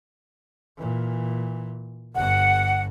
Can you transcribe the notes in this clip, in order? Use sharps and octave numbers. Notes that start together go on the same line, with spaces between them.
A#2 E3
G1 G2 F#5